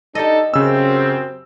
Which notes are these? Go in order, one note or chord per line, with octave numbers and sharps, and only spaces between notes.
D4 D#4 G4 A4 D#5
F#2 C#3 C4 E6